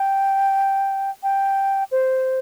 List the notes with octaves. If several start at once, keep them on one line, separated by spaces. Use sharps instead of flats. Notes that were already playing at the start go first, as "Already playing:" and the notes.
Already playing: G5
G5
C5